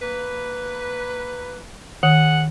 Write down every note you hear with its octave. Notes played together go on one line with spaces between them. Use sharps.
A#3 B4
D#3 G#4 F#5